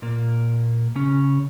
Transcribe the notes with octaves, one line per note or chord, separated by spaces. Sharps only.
A#2 A#3
C#3 C#4